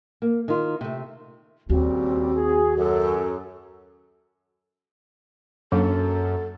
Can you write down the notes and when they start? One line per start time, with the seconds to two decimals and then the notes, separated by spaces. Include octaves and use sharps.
0.22 A#3
0.48 D#3 F4
0.81 C3 A3
1.70 D#2 A#2 C#3 G3 C4 F#4
2.36 G#4
2.77 F#2 A4
5.72 F#2 F#3 A#3 D4 A4